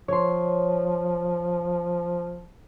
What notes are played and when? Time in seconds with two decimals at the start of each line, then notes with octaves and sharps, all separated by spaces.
0.08 F3 C#5 C6